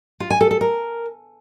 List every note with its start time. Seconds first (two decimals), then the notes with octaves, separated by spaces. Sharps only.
0.20 F4
0.30 G#5
0.41 A4
0.51 A4
0.61 A#4